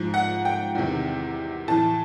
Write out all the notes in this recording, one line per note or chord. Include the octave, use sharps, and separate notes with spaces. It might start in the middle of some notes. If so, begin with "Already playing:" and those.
Already playing: G#2 F3
F#5
G5
E2 C3 D#3
A2 E3 A5